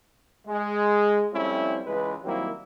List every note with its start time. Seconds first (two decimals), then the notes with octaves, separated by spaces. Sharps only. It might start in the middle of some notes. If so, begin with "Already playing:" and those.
0.47 G#3
1.33 F3 G3 A3 C4 C#4 E4
1.86 C#2 E3 G#3 B4
2.23 D#3 F#3 G3 A#3 C4 E4